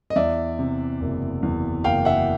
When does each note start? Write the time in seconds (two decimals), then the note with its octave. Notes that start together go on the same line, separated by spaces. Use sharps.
0.10 D#5
0.16 E2 D5 E5
0.59 C3
1.01 F#1
1.43 E2
1.84 F#1 F5 G5
2.05 E5 F#5